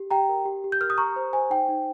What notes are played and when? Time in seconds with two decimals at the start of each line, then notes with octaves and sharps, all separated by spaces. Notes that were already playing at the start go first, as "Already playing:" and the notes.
Already playing: G4
0.10 G4 G5 A#5
0.29 A#4
0.45 G4
0.64 G4
0.72 G6
0.81 A#4 F6
0.90 D#6
0.98 G4 A#5 C#6
1.16 C5
1.33 C5 G#5
1.50 D#4 G5
1.69 D#4